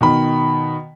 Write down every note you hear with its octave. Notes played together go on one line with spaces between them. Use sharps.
B2 D#3 B5